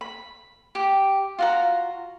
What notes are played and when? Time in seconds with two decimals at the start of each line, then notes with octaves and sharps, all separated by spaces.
0.01 B5
0.75 G4
1.39 F4 F#4 A#5